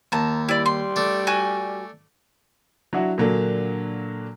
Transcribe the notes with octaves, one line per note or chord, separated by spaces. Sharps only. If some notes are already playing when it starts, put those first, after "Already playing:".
D#2 A5 A#5
G3 E4 D5
C6
A3 D4
F#4 G#5
F#3 D4 E4 F#4
A#2 D3 F#3 A#3 D4